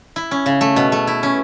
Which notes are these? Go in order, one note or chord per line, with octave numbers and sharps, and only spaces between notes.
E4
C#4
C#3
A3
B2
A3
E4
C#4